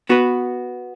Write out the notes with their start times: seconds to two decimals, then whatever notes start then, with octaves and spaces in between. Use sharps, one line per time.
0.09 B3 F#4 B4